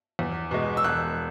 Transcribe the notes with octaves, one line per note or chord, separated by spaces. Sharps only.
E2
B2 G#3
E6
E1 F#6